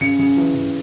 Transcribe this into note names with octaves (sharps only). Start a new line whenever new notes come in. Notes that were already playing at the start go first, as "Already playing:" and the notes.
C#3 C#7
C#3
E3
C#3